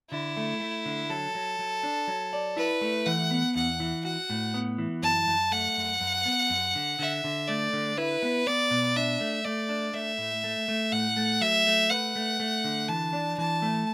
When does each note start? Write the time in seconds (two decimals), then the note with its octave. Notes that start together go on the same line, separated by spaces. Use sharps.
0.11 D3 E4
0.37 A3
0.60 A3
0.86 D3
1.10 F#3 A4
1.35 F#3
1.59 F#3
1.83 D4
2.08 F#3
2.33 D5
2.57 E4 B4
2.81 A3
3.06 E3 F#5
3.31 B3
3.56 E2 F#5
3.80 E3
4.05 F#4 F#5
4.30 A2
4.54 B3
4.78 E3
5.02 F#2 A5
5.27 F#2
5.51 A3 F#5
5.77 F#2
6.01 F#2
6.26 B3
6.50 F#2
6.75 D3
6.99 D3 E5
7.24 D3
7.48 A3 D5
7.73 D3
7.98 E4 B4
8.23 B3
8.47 B3 D5
8.71 B2
8.96 D4 E5
9.20 A3
9.45 A3 D5
9.69 D4
9.94 A3 E5
10.18 A2
10.44 A3
10.68 A3
10.92 A2 F#5
11.17 A3
11.41 F#3 E5
11.67 A3
11.90 B4 F#5
12.16 A3
12.40 A3
12.64 D3
12.89 E3 A5
13.13 D4
13.38 E3 A5
13.62 A3